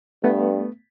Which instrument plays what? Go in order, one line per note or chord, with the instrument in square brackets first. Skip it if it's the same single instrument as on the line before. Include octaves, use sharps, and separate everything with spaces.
[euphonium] G2 [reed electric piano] A3 B3